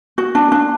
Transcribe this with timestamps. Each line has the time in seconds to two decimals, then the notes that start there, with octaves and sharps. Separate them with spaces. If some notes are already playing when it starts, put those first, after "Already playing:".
0.18 F#4
0.35 D4
0.52 D4